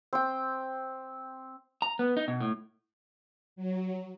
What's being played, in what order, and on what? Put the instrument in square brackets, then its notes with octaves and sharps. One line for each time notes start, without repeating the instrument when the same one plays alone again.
[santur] C4 G5
[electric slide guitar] A#5
B3
D#4
B2
A2
[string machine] F#3